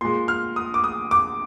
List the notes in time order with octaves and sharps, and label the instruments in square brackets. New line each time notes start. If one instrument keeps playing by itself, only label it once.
[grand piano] A#2 G#3 C6
F6
D#6
D6
D#6
D6